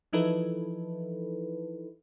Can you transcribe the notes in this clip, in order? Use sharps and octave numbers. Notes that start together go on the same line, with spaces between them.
E3 F3 D#4 E4 A4 B4